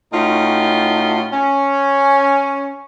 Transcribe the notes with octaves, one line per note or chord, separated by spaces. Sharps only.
A2 C#4 D#4 F4 F#4
C#4